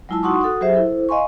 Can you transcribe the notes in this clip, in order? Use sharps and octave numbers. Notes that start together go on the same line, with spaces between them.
F#3 G#3 E4 F4 A5 E6
D#4 F#4 F#5 C6 C#6 D#6
F#4 A4 F#5 D#6
F#3 G4 G#4 C5 E5
E4 A4 C5
D#5 F5 G#5 C6 C#6